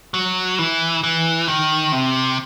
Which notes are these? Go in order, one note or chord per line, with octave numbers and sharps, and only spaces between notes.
F#3
E3
E3
D#3
C3